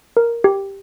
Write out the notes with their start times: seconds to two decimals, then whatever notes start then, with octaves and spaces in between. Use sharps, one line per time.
0.17 A#4
0.44 G4